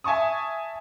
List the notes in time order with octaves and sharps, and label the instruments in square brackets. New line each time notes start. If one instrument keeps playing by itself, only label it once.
[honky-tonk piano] E5 G#5 A5 C#6 D#6